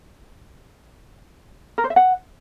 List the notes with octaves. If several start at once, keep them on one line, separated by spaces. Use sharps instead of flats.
A#4
C5
E5
F#5